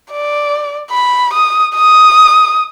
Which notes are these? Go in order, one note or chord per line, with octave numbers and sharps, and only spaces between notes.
D5
B5
D#6
D#6